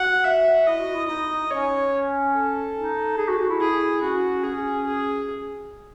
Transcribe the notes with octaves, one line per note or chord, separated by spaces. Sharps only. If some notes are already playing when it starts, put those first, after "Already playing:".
Already playing: F#4 F#5
E5
E4 D#5
F#4
E4
D#4 D#5
C#4 C#5
A4
D#4
G#4
F#4
F#4
E4
E4 G#4
C#4 F#4
C#4 G#4
G#4